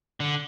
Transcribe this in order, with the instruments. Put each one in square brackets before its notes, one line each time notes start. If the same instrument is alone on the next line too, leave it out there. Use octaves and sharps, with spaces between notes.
[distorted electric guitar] D3